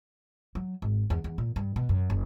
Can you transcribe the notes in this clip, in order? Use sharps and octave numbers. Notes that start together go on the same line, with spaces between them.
F#3
G#1
E2
E2
A#2
G2
B2
F#2
F#1